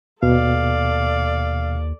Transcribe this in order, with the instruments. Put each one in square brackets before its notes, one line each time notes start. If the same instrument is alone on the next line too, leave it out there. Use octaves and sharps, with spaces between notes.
[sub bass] D#2 [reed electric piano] B2 [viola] A4 D5 [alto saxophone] F5